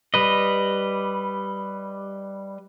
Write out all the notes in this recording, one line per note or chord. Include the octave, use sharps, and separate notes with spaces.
G3 B4 D#5